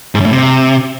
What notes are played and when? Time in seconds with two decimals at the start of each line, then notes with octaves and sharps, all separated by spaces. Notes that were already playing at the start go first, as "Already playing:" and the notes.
0.15 G#2
0.20 F#2
0.26 A2
0.32 C3